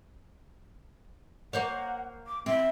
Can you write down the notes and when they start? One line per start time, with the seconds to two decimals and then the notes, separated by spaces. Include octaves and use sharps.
1.53 A#3 C5 C#5 F#5
2.27 D6
2.46 C4 E5